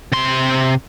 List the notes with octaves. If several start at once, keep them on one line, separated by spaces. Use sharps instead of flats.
C3 C6